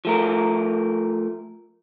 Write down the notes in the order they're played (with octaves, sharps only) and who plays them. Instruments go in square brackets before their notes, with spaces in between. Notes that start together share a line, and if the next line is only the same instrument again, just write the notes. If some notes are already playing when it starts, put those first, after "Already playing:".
[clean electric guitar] F3 A3 A#4